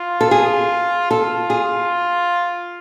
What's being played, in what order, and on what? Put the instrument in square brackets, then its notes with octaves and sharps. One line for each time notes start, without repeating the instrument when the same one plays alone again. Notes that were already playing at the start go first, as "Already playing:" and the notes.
Already playing: [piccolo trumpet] F4
[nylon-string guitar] A4
G#4
[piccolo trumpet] F4 [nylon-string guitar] A4
[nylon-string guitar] G#4